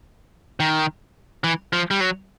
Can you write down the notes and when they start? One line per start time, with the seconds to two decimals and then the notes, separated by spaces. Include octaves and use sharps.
0.60 D#3
1.44 E3
1.73 F3
1.91 G3
2.00 F#3